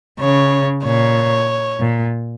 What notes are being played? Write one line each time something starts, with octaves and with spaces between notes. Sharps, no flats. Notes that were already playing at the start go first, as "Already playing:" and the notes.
C#3 C#5
A#2 C#5
A#2